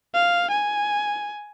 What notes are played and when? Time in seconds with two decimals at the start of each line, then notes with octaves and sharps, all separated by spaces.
0.14 F5
0.51 G#5